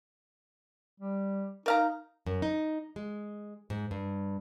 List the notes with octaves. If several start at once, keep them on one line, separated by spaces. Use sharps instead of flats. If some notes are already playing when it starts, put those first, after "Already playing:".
G3
D#4 A#4 F5 A#5
F#2
D#4
G#3
G#2
G2